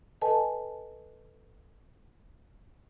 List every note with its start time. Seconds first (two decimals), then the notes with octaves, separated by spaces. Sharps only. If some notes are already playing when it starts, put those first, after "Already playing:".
0.22 A4 B4 D#5 G#5 A5